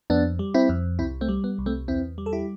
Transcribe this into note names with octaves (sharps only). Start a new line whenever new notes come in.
F2 B3 D4
G3
C4 E4
F2
C2 C4 E4
A3 C4
G3
B3
C2
A3 C4
E2 C4 E4
G3
A4
E4 G4